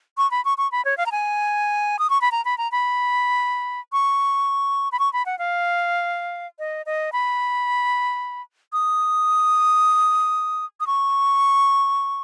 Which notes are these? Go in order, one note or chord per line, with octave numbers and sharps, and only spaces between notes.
C#6
B5
C#6
C#6
B5
C#5
F5
A#5
G#5
D#6
C#6
B5
A#5
B5
A#5
B5
C#6
B5
C#6
B5
F#5
F5
D#5
D#5
B5
D#6
D#6
C#6